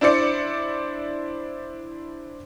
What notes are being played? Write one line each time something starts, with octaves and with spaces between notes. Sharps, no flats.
D4 E4 C5 D5 C#7